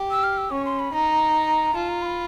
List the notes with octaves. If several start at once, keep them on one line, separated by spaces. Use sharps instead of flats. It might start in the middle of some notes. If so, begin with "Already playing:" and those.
Already playing: G4
E6
F6
E6
C#4 C#6
C6
B5
D#4 A#5
F4 A5
A#5
C6
B5